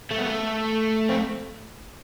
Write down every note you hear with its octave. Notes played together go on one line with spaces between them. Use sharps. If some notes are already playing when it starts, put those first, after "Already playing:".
A3
B3
A3
C4